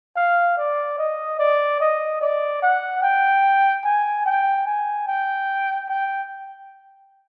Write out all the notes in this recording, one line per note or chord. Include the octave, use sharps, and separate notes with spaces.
F5
D5
D#5
D5
D#5
D5
F#5
G5
G#5
G5
G#5
G5
G5